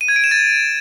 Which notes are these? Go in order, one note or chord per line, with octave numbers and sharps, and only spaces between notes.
D#7
G#6
D7
E7
A6